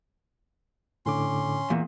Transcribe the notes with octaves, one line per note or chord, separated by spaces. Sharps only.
A2 D3 C#4 C6 D6
E2 A#2